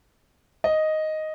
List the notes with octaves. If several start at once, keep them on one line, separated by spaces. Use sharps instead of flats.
D#5